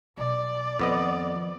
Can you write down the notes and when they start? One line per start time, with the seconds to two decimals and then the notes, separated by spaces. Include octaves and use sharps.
0.17 B1 D5
0.79 F2 D#3 F3 B3 D#5